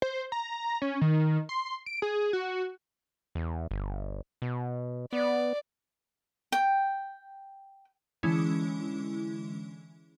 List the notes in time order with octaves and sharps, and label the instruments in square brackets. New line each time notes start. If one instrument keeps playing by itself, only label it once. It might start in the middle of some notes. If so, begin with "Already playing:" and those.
[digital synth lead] C5
A#5
C#4
D#3
C6
D7
G#4
F#4
[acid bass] E2
G1
B2
[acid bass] B3 [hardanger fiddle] D5
[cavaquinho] G5
[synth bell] D3 E3 G#3 C#4 E4